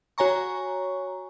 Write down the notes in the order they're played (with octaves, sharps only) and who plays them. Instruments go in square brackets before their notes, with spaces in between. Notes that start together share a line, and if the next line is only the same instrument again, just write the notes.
[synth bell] F#4 C#5 G#5 A#5 C#6